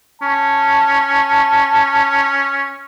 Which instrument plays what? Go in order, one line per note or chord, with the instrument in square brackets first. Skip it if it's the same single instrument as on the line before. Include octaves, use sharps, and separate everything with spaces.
[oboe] C#4 [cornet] A5